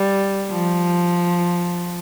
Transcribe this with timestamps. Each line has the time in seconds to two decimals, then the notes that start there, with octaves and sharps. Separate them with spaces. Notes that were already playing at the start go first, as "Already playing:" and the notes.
Already playing: G3
0.51 F3